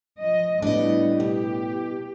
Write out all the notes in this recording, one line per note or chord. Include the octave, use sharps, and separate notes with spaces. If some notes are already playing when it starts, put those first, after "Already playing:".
F3 D#5
A2 G3 B3 D4 D#5
B2 G4